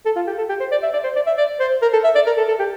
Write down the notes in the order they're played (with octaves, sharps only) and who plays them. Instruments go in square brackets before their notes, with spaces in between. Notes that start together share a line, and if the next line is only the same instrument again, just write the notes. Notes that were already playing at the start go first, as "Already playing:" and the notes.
[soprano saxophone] A4
F4
G4
A4
G4
C5
D5
E5
D5
C5
D5
E5
D5
C5
A#4
A4
E5
D5
A#4
A4
A4
G4